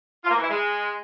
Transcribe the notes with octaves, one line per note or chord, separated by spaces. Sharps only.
F4
A#3
E3
E4
G#3